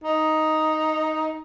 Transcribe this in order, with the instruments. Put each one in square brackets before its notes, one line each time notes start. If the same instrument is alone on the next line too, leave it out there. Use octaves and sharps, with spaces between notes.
[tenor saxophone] D#4